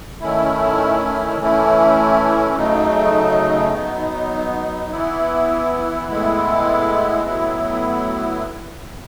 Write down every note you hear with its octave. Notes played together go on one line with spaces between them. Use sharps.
D#3 A3 C#4 E4
E3 A3 C#4 E4
C#3 F#3 A3 D#4
F#3 B3 D#4
E3 B3 E4
A2 G#3 B3 E4
A2 F#3 B3 E4